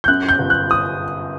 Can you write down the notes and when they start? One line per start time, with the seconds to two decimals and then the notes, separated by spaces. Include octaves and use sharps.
0.04 G6
0.08 F#2 F#6
0.29 G6
0.39 G1
0.50 F#6
0.71 D#6